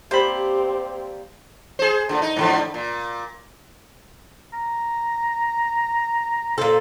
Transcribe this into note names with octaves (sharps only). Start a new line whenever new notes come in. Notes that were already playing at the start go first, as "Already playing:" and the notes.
G3 A#3 C4 G4 C5 B5
G#4 C5
A#2 D3
D#4
G#2 D3 F3
A#2
A#5
A#2 A4 C5